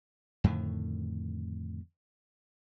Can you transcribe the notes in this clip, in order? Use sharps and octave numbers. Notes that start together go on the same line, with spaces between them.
F2 A2 D3 D#3